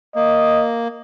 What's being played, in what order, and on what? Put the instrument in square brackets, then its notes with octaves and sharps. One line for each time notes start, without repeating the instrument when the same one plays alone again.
[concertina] A#3 [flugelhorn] D#5